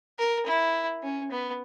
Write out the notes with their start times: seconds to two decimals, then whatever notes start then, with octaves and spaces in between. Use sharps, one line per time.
0.18 A#4
0.46 E4
1.03 C#4
1.31 B3